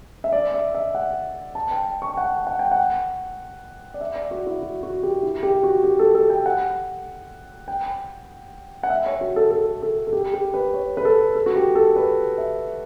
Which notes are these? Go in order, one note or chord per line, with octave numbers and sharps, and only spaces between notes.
E5
D5
E5
E5
F#5
A5
G5
C#6
G5
F#5
F#5
G5
F#5
D5
E5
D5
F#4
E4
F#4
F#4
G4
E4
G4
F#4
G4
A4
A4
G5
F#5
G5
F#5
E5
C#5
F#4
A4
A4
A4
A4
G4
G4
B4
C#5
B4
A4
A4
F#4
G4
A4
B4
E5